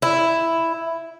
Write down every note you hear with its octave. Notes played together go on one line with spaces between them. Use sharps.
E4